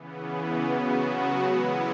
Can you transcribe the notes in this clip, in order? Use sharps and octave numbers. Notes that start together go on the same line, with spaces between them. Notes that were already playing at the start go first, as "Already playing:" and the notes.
Already playing: C#3 E3 B3
C#3 F#3 B3 F#4
E3 G#3 B3 E4